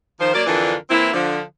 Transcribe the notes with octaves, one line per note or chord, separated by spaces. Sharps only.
D#3 F3 C5
F#3 A#3 A#4 D5
F2 D3 E3 D4 F4 A#4
E3 A#3 C4 E4
D3 F3